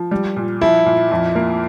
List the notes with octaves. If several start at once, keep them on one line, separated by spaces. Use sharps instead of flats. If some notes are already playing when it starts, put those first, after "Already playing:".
Already playing: F3
G3
A#2
F3 E4
A#2
F2
A#3